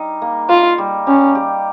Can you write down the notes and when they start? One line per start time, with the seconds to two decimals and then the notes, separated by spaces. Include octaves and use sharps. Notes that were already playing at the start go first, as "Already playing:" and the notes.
Already playing: G3 D#4
0.22 A#3
0.49 F4 A#4
0.78 G3
1.07 G3 C#4
1.35 G4